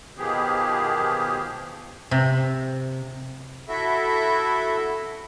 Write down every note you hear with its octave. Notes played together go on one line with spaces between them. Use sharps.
B2 D#3 F3 B3 G4 G#4
C3
E4 F#4 A4 E5